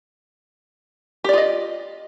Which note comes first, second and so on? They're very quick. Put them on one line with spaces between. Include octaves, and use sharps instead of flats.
G4 D5 F4 D#5